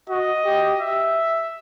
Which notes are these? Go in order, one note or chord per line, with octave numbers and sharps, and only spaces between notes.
F#4 D#5
G4
E5